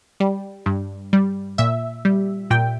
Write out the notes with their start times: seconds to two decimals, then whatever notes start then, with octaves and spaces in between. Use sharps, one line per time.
0.20 G3
0.66 G2
1.13 G3
1.58 A#2 E5
2.05 G3
2.50 A#2 G5